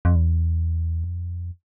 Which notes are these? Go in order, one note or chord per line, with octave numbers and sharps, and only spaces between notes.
F2
E2
F2